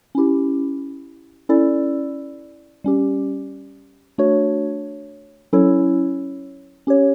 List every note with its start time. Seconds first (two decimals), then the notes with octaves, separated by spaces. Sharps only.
0.15 C#4 E4 G4
1.49 C#4 E4 A4 D5
2.84 G3 C#4 G4
4.18 A3 D4 F#4 C#5
5.53 F#3 C#4 E4 A4 C#5
6.87 C#4 G4 C#5